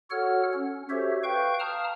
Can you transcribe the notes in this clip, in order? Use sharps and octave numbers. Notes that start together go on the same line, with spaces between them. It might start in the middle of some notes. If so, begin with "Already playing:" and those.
F#4 A4 C#5 F#5 F6
C#4
F#4 G4 A4 C5 C#5 E5
B4 F5 G5 C#6 G6
F5 A5 A#5 D#6 F6